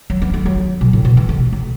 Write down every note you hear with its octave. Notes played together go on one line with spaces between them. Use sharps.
F#3
B3
A3
F#3
B2
A2
B2
E3
A3
A3